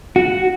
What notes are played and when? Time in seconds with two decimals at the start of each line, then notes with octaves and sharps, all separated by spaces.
0.16 F#4